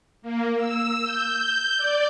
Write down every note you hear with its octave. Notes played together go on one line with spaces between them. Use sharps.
A#3
E6
G6
D5